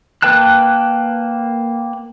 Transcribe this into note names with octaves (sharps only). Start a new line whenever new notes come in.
A#3 B4 G5 A5 F#6